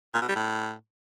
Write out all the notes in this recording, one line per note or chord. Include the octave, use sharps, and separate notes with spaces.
A#2
B2
G3
A2